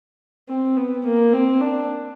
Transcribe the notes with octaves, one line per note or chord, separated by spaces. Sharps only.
C4
B3
A#3
C4
D4